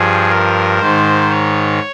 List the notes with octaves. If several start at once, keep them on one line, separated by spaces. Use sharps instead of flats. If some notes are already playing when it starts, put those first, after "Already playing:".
Already playing: G2 F3 G#4
A#4
G#2 D#3 C5
C#5